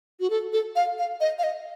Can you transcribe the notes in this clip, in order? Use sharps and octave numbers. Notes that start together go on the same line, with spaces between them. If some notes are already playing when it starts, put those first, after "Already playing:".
F#4
A4
A4
F5
F5
D#5
F5
D#5